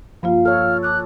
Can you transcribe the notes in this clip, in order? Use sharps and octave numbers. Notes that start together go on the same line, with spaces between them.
G2 F3 A#3 F4 F5
A4 C#5 F6
A5 D6 F6 F#6